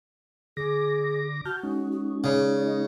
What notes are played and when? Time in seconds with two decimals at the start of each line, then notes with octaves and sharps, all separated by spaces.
0.57 D3 G#4 D6 A#6
1.45 F#4 A5 F6 G6
1.63 G#3 C#4 D#4
1.92 F#4
2.24 C#3 D5
2.66 D#5